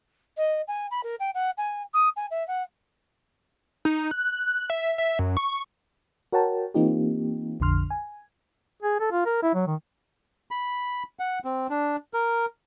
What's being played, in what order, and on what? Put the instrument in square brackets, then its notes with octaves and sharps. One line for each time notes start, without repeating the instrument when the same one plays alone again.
[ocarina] D#5
G#5
B5
A#4
G5
F#5
G#5
D#6
G#5
E5
F#5
[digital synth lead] D#4
F#6
E5
E5
F#2
C#6
[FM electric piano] F#4 A#4 C#5 F#5 G5 A5
E3 A#3 C4 D#4 F4 G4
A#1 F2 D3 C6 F6
G#5
[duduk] G#4
A4
F4
A#4
E4
F#3
D#3
[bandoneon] B5
F#5
C4
D4
A#4